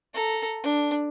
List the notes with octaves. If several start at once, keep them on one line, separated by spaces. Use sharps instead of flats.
A4 A#5
D4